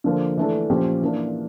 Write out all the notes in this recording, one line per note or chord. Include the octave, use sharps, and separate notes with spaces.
D3 F3 A#3
E3 A3 D4 A4
A#2 F3 C#4 G4
E3 A#3 D4